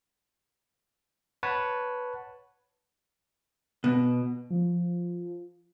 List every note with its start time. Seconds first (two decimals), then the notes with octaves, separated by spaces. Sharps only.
1.43 B4 C#5 F#5 A5
3.84 B2
4.50 F3